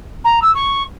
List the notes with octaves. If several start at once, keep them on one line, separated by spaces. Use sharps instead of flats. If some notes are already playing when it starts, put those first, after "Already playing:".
A#5
E6
C#6